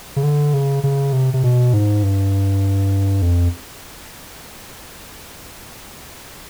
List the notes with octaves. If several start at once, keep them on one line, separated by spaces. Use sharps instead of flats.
C#3
D3
C#3
C#3
C3
C3
B2
G#2
G2
F2